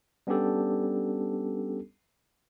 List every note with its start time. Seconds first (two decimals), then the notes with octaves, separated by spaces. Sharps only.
0.27 G3 B3 C#4 D4 G4 A4